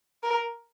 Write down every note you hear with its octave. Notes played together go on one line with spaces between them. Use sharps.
A#4